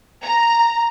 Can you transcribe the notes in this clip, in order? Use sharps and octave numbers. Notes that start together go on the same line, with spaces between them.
A#5